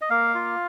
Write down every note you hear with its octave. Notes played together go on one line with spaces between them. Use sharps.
D#5
A#3 F5
F4